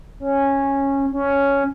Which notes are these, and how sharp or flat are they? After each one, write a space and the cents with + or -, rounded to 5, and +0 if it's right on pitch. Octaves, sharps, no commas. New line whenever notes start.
C#4 -10
C#4 +5